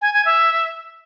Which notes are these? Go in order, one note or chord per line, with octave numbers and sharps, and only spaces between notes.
G#5
G#5
E5